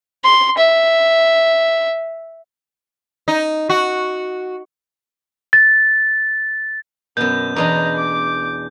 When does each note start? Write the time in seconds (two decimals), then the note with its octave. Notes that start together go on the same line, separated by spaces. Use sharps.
0.24 C6
0.58 E5
3.28 D#4
3.69 F#4
5.53 A6
7.17 F#2 B2 B3 G6
7.56 E2 E3 D4 D#5 A#5
7.97 D6